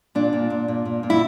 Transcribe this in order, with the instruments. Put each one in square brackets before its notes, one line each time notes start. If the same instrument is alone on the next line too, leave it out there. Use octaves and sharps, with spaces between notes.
[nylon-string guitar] A#2 D4
A#2
A#2
A#2
A#2
A#2
E4